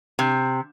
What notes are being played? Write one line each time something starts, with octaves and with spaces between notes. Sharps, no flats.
C3